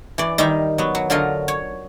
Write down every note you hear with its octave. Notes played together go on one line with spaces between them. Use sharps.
E3 D5
D#3 G3 D#4 E5 A#5
F#3 B3
F#3
D3 F#3 F4 A#4 D#5 F5
C#5